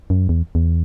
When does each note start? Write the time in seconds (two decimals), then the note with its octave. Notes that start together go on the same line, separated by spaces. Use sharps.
0.10 F#2
0.29 E2
0.55 E2